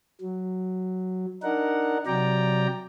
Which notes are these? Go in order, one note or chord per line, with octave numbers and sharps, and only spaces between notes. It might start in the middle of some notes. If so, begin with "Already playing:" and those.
F#3
D4 D#4 A#4 F#5
C3 F#3 D5 G5 A#5